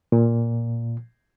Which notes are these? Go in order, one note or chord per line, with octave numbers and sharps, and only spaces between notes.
A#2